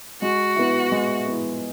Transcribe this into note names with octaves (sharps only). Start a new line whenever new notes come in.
G#3 F#4
B3 E4
G#3
B3 E4